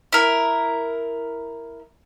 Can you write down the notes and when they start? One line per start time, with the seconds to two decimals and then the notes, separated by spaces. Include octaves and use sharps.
0.13 E4 A#4